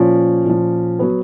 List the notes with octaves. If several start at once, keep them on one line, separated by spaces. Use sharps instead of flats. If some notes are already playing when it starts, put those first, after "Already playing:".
Already playing: A#2 F3 C#4
A#2 F3
F#3 B3